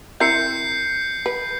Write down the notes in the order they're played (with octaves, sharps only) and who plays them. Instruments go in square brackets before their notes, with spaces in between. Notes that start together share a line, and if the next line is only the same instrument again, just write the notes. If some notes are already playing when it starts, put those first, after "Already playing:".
[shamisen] C4 E4 A#4 [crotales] G6 C7 C#7
[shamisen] B4